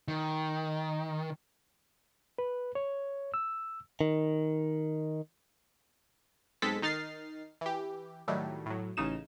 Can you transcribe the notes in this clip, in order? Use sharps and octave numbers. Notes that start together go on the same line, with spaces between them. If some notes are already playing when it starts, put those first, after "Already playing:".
D#3
B4
C#5
E6
D#3
B1 G#3 C4 A4 B6
D#3 D#4 F6 A6 C7
E3 G4
A2 D#3 F#3 G3 A3
A2 F#3
A1 C#3 D#4 E7